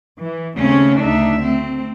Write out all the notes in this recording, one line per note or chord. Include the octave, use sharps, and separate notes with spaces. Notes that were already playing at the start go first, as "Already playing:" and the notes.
E3
D#2 C#3 A3 C4 C#4
D2 D4 D#4 E5
A3 C4